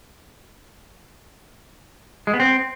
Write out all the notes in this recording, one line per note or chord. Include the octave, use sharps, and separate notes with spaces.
G#3
B3
C4